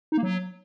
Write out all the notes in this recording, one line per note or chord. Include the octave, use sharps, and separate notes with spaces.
D#4
A#3
F#3